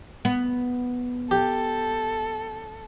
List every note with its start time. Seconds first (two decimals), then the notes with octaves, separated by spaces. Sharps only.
0.25 B3
1.31 G4 A4